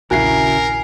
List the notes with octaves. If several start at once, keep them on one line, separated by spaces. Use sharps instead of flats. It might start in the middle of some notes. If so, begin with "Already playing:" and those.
A#1 D#2 C#3 E4 F#4 A#4 G#5 C7